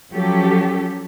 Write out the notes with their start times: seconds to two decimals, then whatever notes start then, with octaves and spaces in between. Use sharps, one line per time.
0.11 F3 F#3 C#4 G4 A4